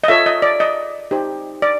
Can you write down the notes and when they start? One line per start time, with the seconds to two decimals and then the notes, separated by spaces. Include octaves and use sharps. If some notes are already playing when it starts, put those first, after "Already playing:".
0.04 D#5
0.08 F4 A4 C#5 E5
0.26 D#5
0.42 D5
0.60 D#5
1.11 D#4 G4 C5
1.62 D5